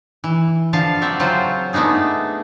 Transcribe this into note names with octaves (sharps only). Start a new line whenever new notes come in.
E3
D3 F3 F5 A5
F#3 C4 D5 E5
C#3 F#3 C4 F4 C5
A3 B3 D4 D#4 G#4